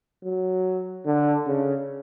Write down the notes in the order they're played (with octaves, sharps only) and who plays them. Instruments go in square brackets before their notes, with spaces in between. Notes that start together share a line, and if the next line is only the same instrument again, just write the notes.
[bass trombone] F#3
D3
C#3